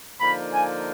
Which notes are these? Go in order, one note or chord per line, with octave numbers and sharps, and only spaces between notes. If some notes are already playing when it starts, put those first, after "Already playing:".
D3 F3 A#3 D#4 B5
G#5